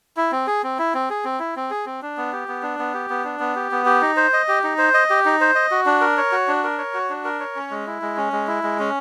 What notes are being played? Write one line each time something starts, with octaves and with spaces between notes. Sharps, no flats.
E4
C4
G#4
C4
E4
C4
G#4
C4
E4
C4
G#4
C4
D4
B3
G4
B3
D4
B3
G4
B3
D4
B3
G4
B3
G4
D#4
C5
D#5
G4
D#4
C5
D#5
G4
D#4
C5
D#5
F#4
D4
A#4
C#5
F#4
D4
A#4
C#5
F#4
D4
A#4
C#5
C#4
G#3
E4
G#3
C#4
G#3
E4
G#3
C#4